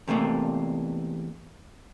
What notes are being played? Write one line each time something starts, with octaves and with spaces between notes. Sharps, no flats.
E2 C3 A3 A#3